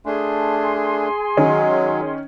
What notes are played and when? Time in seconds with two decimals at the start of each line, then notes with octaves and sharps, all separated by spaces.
0.06 A3 D4 G#4 G#5 C6
1.37 D#3 F#3 G#3 C#4